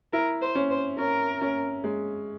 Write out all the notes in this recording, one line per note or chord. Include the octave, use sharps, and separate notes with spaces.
E4 A#4
C5
C#4
C5
C#4 A#4
C#4
G#3